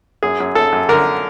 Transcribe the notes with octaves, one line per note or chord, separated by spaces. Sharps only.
F#2 G#4
F#2
F#2 A4
F#2
D3 A#4